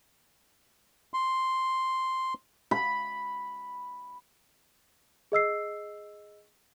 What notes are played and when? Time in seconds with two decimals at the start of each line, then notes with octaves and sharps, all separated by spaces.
1.14 C6
2.71 B5
5.32 G#4 D#5 E6 C7